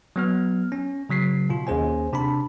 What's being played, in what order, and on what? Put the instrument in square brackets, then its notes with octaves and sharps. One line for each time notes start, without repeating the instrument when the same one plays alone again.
[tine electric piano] F#3 B3 F6
C#4
C#3 F#3 B6 C7
B2 F4
D#2 C#4 G#4 C5 G#5
C3 D4 A5 B5